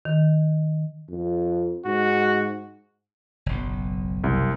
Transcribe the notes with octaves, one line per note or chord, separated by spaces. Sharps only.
D#3
F2
G#2 F#4
F#1 B1
C2